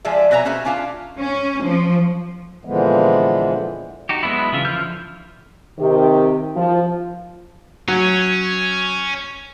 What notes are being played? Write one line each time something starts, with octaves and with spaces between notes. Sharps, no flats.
F3 G#3 G#4 D5 E5
B2 B4 C#5 E5 G#5 A#5
A#3 C#4 F#4 G#4 C5 E5
C#4 D4 F4 F5 A5
C#4
F3
A#2 D3 E3 F3 G#3 B3
D#4 F#4 G4
F#3 G#3 B3 D4 E4
C#3 E3 F4 E5
D3 E3 F3 F6 G6
C3 D#3 G4
F3
F#3 C#4